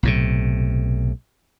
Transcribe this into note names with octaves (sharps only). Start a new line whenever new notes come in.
B1 A2 C3